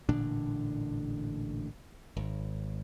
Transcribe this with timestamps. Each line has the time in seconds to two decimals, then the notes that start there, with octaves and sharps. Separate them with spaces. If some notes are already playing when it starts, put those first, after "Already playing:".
0.09 A1 A#2 D3 D4
2.17 G#1